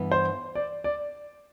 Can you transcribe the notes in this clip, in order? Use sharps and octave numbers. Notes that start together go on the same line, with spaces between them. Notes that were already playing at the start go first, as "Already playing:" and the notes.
Already playing: G2 E3 B3
C5
D5
D5